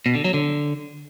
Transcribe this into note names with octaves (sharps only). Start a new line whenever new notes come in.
B2
D3
F#3
D3